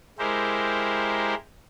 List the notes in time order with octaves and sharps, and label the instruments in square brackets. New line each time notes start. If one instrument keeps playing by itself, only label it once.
[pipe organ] G#3 E4 G4 A#4 C5